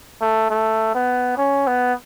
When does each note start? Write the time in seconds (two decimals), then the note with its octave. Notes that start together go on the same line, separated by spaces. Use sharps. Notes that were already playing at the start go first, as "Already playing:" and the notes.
0.21 A3
0.51 A3
0.95 B3
1.37 C#4
1.67 B3